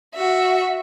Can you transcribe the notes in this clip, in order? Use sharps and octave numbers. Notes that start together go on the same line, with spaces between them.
F#4 E5